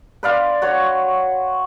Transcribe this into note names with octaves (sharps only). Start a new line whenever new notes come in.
B4 D5 F5 C6
F#4 C#5 C#6